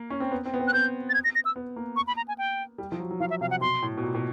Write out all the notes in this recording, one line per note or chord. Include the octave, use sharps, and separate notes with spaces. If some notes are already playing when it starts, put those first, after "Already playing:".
Already playing: A#3
C#4
C4
B3
C4
B3
C4
F#6
C4 G6
A6
G#6
A#6
A#6
E6
B3
A#3
C#6
B5
A#5
G#5
G5
G3
F3
F#3
F#3
F3 F5
E5
C3 F5
F#5
B2 C6
A2
B2
A#2
B2